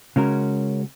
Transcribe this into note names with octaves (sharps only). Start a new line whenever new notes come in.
C#3 G#3 C#4 F#4 A#4